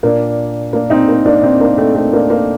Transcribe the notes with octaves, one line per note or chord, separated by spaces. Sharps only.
A#2 A#3 D4
A#3 D4
C4 D#4
A#3
A#3 D4
C4 D#4
A#3 D4
A3 C4
A3 C4
A#3 D4
A#3